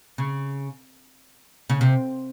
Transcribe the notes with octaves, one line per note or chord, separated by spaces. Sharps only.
C#3
C#3
C3